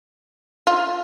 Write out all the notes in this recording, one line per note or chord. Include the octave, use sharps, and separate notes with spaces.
F4